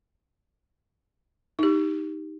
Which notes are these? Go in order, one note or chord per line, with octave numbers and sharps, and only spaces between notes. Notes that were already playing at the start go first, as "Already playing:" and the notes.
D#4 G4